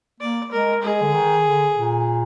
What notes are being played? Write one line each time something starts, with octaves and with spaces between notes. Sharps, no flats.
A#3 D5
G#3 A#4
G#3 G#4
D3
D#3
D3
A#2